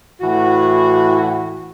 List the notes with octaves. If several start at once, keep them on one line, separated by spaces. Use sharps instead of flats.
A2 E3 F#4